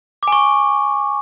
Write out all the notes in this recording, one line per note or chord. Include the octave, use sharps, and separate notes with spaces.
G#5 C#6 D6